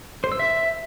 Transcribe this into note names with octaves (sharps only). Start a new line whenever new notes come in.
C5
E6
E5